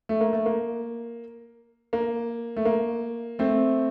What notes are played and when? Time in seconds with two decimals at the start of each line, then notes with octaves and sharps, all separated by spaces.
0.09 A3
0.21 A#3
0.33 A3
0.46 A#3
1.93 A#3
2.56 A3
2.65 A#3
3.39 A3 C4